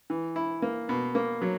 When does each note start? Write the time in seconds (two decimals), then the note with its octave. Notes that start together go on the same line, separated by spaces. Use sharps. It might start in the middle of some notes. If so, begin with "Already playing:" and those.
0.10 E3
0.36 E4
0.62 A#3
0.89 B2
1.15 A#3
1.42 F#3